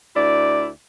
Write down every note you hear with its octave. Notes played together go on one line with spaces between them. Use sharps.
D2 E4 D5